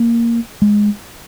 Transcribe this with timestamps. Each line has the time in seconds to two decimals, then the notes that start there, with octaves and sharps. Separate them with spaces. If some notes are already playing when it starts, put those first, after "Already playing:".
Already playing: A#3
0.62 G#3